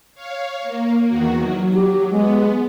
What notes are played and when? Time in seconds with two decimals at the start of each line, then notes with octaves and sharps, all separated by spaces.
0.14 C#5 F5
0.62 A#3
1.07 E2 D#3 F#4
1.37 F#3
1.74 G4
2.11 G#3 B3